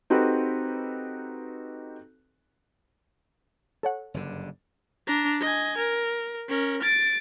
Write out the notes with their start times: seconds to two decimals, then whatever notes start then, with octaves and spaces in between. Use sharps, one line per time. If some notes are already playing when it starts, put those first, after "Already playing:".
0.10 C4 D#4 F#4 G4 A4 B4
3.83 A4 C#5 F#5
4.14 F#1 G2 D3
5.07 D4 A#5
5.41 D#5 G#5
5.78 A#4
6.48 C#4 A#4
6.82 A6 D7